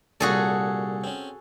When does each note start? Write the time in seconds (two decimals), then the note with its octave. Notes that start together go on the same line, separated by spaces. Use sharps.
0.20 C2 A#2 F#4 G#4 A4 C#5
1.04 C4 C#4